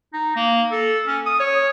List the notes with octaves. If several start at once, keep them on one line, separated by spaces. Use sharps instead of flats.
D#4
A#3
A4
C#4
D#6
C#5